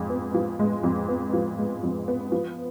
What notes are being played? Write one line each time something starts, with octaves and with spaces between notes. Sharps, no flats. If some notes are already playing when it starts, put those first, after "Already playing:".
Already playing: F2 G#3
B3
F3
G#3
F2
B3
F3
G#3
F2
B3
F3